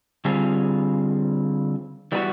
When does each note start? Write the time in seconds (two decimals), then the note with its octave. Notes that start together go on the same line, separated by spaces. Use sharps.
0.25 D3 G3 C4 F4 G#4
2.12 E3 G3 B3 D#4 F#4